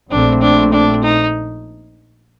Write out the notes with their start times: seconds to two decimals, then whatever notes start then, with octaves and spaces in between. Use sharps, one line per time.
0.10 A#1 A#2 A3 C4 D4
0.41 D4
0.72 D4
1.03 D#4